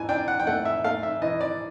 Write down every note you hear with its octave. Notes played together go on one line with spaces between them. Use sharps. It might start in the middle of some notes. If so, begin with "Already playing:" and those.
Already playing: E3 G#5
D4 G5
F#5
G5
A3 F#5
E5
A3 F5
E5
E3 D#5
D5